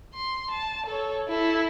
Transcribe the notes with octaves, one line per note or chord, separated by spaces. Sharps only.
C6
A5
A4 C#5
E4 A4